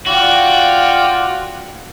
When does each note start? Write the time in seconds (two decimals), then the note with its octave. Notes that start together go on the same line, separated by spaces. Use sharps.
0.06 F4 F#4 D5 G5